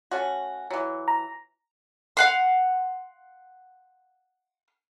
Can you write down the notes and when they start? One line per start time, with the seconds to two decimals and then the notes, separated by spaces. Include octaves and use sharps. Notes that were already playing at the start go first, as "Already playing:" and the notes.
0.11 A3 C#4 F#4
0.71 E3 F#3
1.08 A#5
2.17 F5 F#5 C6